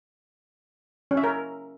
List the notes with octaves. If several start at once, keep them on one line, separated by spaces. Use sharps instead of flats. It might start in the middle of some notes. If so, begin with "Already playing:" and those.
C#4
E5
A#4